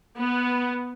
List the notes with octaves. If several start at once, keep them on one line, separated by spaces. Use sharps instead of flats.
B3